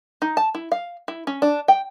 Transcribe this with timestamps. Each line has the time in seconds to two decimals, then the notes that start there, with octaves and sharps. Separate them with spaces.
0.22 D#4
0.37 A5
0.55 E4
0.72 F5
1.08 E4
1.27 C#4
1.42 D4
1.68 G5